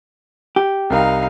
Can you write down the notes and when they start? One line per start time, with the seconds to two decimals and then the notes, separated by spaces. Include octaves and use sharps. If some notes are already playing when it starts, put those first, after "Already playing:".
0.56 G4
0.90 C2 D#4 A#4 F5